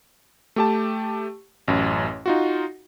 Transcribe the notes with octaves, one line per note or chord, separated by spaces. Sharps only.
A3 G4 A5
A1 F#2
D#4 F4 F#4